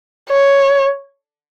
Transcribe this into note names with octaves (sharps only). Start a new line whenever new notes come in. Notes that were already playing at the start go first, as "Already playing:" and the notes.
C#5